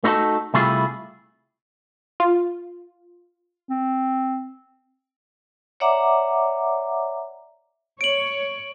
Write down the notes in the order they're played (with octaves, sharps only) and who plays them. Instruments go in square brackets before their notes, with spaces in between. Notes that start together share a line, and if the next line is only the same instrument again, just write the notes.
[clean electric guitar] A3 D#4 E4 F#4 A4
C3 G3 A3 E4 F4 G#4
[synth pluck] F4
[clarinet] C4
[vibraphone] C#5 D5 E5 F#5 A#5 D6
[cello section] C#5 [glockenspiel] D7 F#7